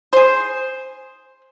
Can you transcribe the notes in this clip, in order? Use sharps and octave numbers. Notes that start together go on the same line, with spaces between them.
G#4 C5